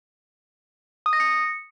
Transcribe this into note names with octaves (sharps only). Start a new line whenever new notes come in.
D#6
A#6
C#7